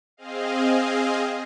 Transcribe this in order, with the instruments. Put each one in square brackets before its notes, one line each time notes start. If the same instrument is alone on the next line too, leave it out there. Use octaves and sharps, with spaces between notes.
[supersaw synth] C4 G#4 D#5 F5